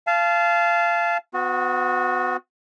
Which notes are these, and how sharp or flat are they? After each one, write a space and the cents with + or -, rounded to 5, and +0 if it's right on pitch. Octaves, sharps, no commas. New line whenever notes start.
F5 -20 A5 -25
B3 +35 F#4 -25